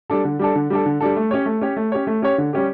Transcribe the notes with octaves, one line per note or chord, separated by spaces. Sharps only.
G3 D4 A4
D3
G3 D4 A4
D3
G3 D4 A4
D3
G3 D4 A4
A3
C#4 G4 C#5
A3
C#4 G4 C#5
A3
C#4 G4 C#5
A3
C#4 G4 C#5
D3
G3 C#4 G4